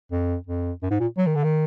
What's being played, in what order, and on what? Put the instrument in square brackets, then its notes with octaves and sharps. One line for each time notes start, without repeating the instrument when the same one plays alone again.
[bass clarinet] F2
F2
F#2
G#2
A#2
F#3
D#3
D3
D#3